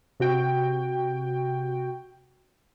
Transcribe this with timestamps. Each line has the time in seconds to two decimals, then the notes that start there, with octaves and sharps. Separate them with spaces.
0.20 C3 F#4 G5